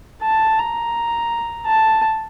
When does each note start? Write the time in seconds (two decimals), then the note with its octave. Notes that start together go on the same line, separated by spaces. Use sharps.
0.22 A5
0.59 A#5
1.66 A5